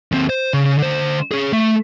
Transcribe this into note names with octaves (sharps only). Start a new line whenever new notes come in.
D#2 C4
C5
C#3
D3 C5
C#4 G#4
A3